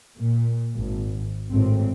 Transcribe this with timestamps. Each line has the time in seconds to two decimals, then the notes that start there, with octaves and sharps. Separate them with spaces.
0.18 A#2
0.76 G#1
1.49 G#1 A2 C4